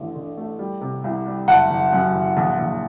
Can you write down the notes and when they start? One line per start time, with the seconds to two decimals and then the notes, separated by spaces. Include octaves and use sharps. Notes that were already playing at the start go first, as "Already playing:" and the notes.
Already playing: A1 D3
0.15 D3
0.37 A3
0.59 G3
0.81 C3
1.04 C2
1.27 G3
1.48 F#1 F#5 A5
1.70 F#1
1.93 F#2
2.14 F#1
2.37 A#1
2.59 A#1